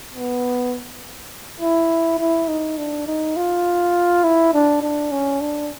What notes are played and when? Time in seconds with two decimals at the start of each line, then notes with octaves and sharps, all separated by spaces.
0.15 B3
1.61 E4
2.19 E4
2.48 D#4
2.78 D4
3.07 D#4
3.36 F4
4.24 E4
4.54 D4
4.82 D4
5.12 C#4
5.41 D4